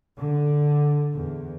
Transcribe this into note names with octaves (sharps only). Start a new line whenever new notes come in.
D3
E2